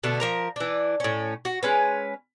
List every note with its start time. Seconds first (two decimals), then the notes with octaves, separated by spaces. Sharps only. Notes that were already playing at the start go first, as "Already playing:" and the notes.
0.03 B2 D3 A3 A5
0.20 F3 A#4 A#5
0.56 E3 D4
1.00 A2 C#4
1.45 F#4
1.63 G#3 C#4 B4